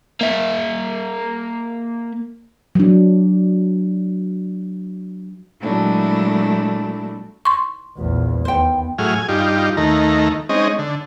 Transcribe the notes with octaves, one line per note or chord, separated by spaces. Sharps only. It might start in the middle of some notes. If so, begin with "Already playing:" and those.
A#3 E5
F#3 D4
A#2 F#3 G#3 A3 D4 E4
C6 C#6
A#1 E2
D#2 B3 C5 G5
A2 F#3 G#4 F6
G#5
G2 D#4 F4 G4
D#2 D#3 A3 A#5
G#3 C4 C#4 D#4 D#5
D3